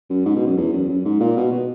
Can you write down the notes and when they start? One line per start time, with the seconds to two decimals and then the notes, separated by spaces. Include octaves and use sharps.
0.10 F#2
0.26 G#2
0.36 B2
0.47 F#2
0.57 E2
0.73 F#2
0.89 F#2
1.05 G#2
1.21 A#2
1.37 B2
1.52 B2